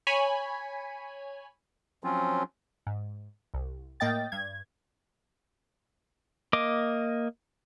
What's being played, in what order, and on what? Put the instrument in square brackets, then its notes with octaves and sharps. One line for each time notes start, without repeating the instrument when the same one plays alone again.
[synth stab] C#5 G#5 B5
[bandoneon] F3 F#3 C4 C#4 F4
[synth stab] G#2
C2
A2 A#3 D#5 G5 A6
G2 G#6
[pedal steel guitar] A#3 D#5 D6